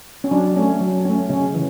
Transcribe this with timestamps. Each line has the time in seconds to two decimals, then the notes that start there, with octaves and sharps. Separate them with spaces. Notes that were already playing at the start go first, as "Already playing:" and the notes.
0.24 C#4
0.31 F#3 D4
0.56 A3 C#4
0.81 F#3
1.05 A3 C#4
1.29 C#3 C#4
1.54 E3